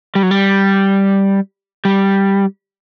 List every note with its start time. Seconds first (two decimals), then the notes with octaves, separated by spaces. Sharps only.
0.15 G3
0.23 F#3
0.31 G3
1.85 G3